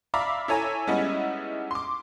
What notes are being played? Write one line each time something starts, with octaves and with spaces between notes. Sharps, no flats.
D5 E5 F5 A#5 B5 D6
E4 A4 C#5 G#5 A#5
G3 G#3 B3 C#4 D#4 E4
C6 D6